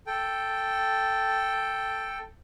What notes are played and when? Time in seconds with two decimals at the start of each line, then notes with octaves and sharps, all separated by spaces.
0.07 A4 G5